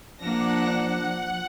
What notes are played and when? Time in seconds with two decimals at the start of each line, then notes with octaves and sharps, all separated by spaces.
0.21 F3 A#3 D4 F#5 A5 A#6